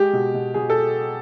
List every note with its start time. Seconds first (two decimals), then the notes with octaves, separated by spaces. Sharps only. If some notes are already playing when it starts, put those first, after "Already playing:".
Already playing: G#3 G4
0.13 B2
0.34 B2
0.54 B2 G#4
0.70 A4